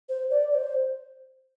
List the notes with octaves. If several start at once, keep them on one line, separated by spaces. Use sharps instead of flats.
C5
D5
D5
C5